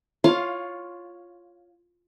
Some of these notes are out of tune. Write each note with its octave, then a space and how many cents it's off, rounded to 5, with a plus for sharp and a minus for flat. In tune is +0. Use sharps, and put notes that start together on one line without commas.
F4 +0 C#5 +0 F5 +20